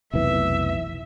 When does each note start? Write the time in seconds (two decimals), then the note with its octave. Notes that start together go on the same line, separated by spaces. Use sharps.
0.14 F1 B1 E3 E5